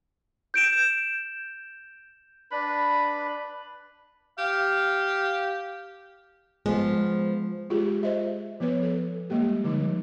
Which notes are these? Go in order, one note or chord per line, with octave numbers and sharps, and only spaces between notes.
G6 D7 E7
D4 B4 B5
G4 F5
F3 G#3 B3
G#3 F4 G4 G#4
C5 D#5 E5
F3 B3 B4 C#5
A4
G3 G#3 A#3 G4
D3 F3 G3 D#4